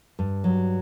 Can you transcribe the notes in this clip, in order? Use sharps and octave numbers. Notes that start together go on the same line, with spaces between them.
G2
F#3